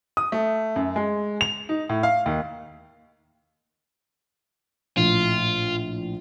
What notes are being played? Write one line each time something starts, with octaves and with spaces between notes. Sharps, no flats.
D#6
A3
F#2
G#3
F7
D#4
A2
F5
D#2
A#1 A2 F4